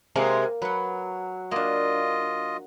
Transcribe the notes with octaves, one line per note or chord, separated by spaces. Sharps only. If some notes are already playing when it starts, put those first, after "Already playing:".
C3 G#3 A#3 F5
F#3 B4 F#5
A#3 D4 F4 D#5